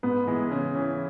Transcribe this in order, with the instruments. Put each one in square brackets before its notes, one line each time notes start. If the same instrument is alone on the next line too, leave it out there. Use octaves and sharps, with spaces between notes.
[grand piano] G#2 [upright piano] B3
[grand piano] E3 G#3
C#3
E3 C#4